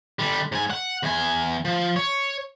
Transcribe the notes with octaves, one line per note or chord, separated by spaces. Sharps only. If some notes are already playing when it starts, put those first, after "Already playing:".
D3 G3
G#2 G#5
F#5
E2 G#5
F3
C#5